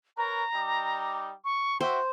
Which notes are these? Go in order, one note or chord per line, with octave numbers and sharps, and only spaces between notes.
A#4 B4 C#5 A#5
G3 D#4 D6
C#6
F#4 C5 E5 G5